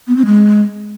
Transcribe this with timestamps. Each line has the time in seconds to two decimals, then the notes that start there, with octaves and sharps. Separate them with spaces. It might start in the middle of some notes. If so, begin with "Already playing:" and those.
0.08 B3
0.17 C4
0.26 G#3